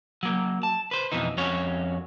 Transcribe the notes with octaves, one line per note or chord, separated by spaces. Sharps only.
F#3 A#3
A5
B4 C5
F2 B2 E3 D#4
F2 C#4 F#4 C#5